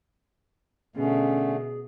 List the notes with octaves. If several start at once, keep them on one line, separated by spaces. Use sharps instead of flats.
B2 D3 A3 C#4 G#4